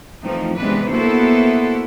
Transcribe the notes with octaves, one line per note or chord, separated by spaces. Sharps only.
E3 F3 A3 C4 D#4
C3 E3 G#3 B3 D4 B4
A#3 B3 E4 F#4 A4 C5